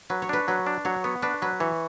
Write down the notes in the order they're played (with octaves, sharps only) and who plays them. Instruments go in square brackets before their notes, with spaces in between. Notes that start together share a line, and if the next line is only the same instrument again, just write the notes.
[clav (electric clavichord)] F#3 [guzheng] B4
[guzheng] C#5
[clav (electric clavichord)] D4 [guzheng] B4
[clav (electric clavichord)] F#3 [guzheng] B4
[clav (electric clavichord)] D4
[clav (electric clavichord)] F#3 [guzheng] C#5
[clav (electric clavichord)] B3 [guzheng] C#5
[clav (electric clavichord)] D4 [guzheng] B4
[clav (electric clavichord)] F#3 [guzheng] B4
[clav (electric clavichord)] E3 [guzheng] C#5